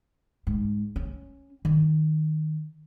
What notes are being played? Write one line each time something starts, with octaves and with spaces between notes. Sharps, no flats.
G#2
C#4
D#3